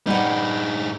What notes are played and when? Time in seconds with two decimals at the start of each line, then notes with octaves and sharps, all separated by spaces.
0.07 G2 G3 D#4 F#5